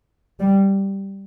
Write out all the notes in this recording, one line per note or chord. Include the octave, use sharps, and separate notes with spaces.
G3